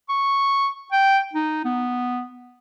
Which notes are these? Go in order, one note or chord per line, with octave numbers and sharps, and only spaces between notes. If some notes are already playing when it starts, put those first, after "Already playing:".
C#6
G5
D#4
B3